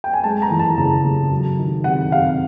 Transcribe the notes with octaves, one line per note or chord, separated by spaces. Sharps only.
G5
G#5
G#3 A5
A#5
E3
A5
C#3 A#5
C#3
F#3
D#3
C3 F#5
C3 F5